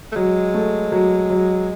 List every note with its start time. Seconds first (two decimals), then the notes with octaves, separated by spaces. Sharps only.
0.12 A3
0.16 F#3 G#3
0.54 A3
0.92 F#3
1.30 F#3